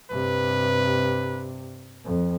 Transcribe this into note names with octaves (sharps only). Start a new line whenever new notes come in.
G2 C3 B4
F2